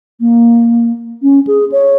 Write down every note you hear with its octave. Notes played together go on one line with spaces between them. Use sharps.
A#3
C#4
G#4
C#5